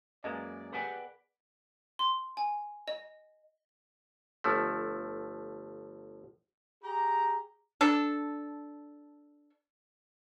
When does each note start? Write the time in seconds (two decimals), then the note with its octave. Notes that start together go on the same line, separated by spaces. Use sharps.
0.24 F#2 G#3 A#3 B4 D5 D#5 A5
0.72 G4 G#4 A#4 B4 D5 F#5 G#5
1.99 C6
2.37 G#5
2.88 D#5
4.44 G1 F3 A3
6.84 G4 G#4 A#5
7.81 D4 A4